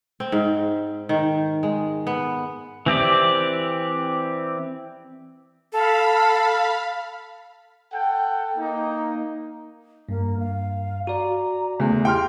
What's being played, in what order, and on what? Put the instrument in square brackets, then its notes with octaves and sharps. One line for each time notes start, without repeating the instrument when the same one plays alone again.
[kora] C4
G#2
D#3
G#3
B3
[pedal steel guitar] E3 C4 G4 D5
[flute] A4 [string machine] F5 B5
[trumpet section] A4 F#5 G5
A#3 D#4
[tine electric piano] G2 [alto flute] A#3
[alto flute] F5
[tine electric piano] F#4 D5 [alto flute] A#5
[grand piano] E2 [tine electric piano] C#3 A3 [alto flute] G#4
[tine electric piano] E4 [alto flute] G4 [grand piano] G5 C6 F6